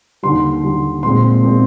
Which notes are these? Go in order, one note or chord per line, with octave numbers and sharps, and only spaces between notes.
D#2 D3 G3 C6
D#2 D3 G3
A#2 G#3 C4 C6
A#2 G#3 C4